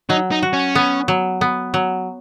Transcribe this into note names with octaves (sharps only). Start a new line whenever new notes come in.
F#3 D#4
D#4
F#4
C#4
B3
F#3
B3
F#3